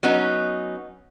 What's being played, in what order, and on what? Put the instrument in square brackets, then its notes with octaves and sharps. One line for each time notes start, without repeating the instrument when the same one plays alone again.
[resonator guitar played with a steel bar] F#3 B3 C#4 D#4